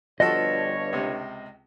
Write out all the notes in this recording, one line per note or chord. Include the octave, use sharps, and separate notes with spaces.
G1 G2 F3 F#4 A4 C#5 D#5
C#2 C3